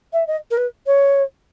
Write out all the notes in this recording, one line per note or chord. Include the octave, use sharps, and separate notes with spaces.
E5
D#5
A#4
B4
C#5